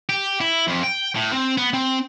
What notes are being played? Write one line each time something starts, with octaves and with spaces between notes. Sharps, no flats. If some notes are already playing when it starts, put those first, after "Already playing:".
G4
E4
F2
G5
A2
C4
B3
C4